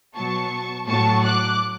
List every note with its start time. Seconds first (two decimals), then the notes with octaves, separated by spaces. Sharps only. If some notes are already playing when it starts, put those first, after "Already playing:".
0.15 B2 F#3 A5 C#6
0.87 A2 F#3 A5 C#6
1.24 D6 F#6